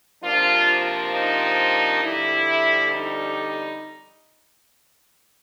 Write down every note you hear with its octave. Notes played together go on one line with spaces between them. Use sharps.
C3 F3 A#3 D4 F4
D#4
F2 D3 G3 E4
D#4